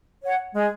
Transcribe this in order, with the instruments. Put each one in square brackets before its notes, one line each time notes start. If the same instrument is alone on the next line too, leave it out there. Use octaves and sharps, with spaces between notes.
[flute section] C#5 F#5
[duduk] G#3 [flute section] G#4